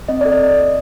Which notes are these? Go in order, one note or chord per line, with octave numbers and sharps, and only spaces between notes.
C4 D#5
A4 D5
D#5